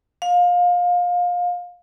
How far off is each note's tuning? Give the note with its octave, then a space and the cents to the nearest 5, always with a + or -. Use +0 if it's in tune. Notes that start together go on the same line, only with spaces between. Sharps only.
F5 +25